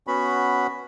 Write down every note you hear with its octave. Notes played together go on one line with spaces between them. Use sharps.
B3 C#4 F#4 B5